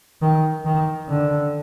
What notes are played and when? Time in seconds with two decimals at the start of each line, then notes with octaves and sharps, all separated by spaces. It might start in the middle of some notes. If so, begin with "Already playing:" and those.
0.22 D#3
0.65 D#3
1.09 D3